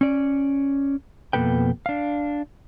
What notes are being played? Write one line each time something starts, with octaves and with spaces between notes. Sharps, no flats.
C#4 D5
F2 B2 A#3 A4 B4 G5
D4 F5